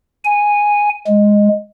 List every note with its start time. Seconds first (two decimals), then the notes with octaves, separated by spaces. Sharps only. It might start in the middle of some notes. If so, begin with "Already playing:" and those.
0.24 G#5
1.07 G#3